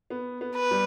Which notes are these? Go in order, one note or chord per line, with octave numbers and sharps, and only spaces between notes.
B3
B3
B4
G3